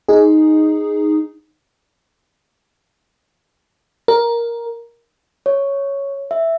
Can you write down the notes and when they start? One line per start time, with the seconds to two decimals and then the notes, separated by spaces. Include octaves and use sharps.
0.08 D#4 G#4
4.08 A#4
5.46 C#5
6.31 E5